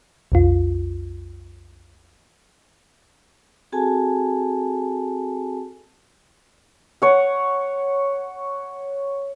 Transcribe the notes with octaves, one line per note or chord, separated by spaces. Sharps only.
B1 F2 F4
C4 F#4 G#4 A4 G#5 A5
C#5 F#5